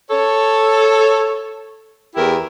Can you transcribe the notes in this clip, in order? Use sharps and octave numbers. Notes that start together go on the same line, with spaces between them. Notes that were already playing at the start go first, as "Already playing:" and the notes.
A4 C#5
E2 E4 G4 A#4